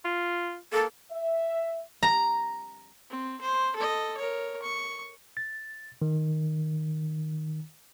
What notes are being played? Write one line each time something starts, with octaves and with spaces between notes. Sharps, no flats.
F4
A#3 A4
E5
A#5
C4
C5
A4 D#5
A#4 C#5
C#6
A6
D#3